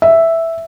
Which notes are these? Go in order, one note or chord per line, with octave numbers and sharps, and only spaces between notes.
E5